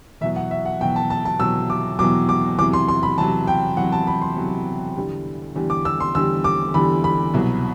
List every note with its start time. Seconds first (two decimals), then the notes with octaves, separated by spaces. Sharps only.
0.21 E2 B2 F#3 E5
0.36 F#5
0.51 E5
0.66 F#5
0.80 E2 B2 F#3 G5
0.96 A5
1.10 A5
1.25 A5
1.40 E2 B2 F#3 E6
1.70 D6
1.99 E2 B2 F#3 D6
2.29 D6
2.59 E2 C3 F#3 D6
2.73 C6
2.88 C6
3.03 B5
3.18 E2 C3 F#3 A5
3.47 G5
3.77 E2 C3 F#3 F#5
3.92 A5
4.07 B5
4.22 C6
4.36 E2 C3 F#3
4.96 E2 D3 G3
5.55 E2 D3 G3
5.70 D6
5.85 E6
6.00 C6
6.15 E2 D3 G3 E6
6.44 D6
6.74 E2 D3 G3 B5
7.04 B5
7.34 C2 B2 F#3